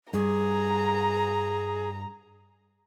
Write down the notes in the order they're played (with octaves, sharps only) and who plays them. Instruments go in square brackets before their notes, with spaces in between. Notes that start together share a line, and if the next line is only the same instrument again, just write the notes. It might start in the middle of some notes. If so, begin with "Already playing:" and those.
[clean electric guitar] G2 [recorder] G#4 [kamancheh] A#5